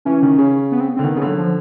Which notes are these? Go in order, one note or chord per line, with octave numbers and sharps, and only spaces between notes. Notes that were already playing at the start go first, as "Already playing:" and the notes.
E3 C#4
D#3
C#3
B3
C4
B3
D3 C4
D#3 B3
C#3 B3
D3 F#3
F3